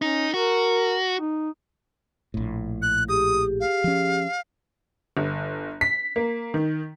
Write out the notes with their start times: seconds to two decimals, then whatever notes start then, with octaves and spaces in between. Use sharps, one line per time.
0.02 C#4 D#4
0.34 F#4 A#4
1.20 D#4
2.34 A#1 A2
2.82 F#6
3.09 G4 G#4 D#6
3.60 F5
3.84 F3 C#4
5.17 G1
5.81 B6
6.16 A#3
6.54 D#3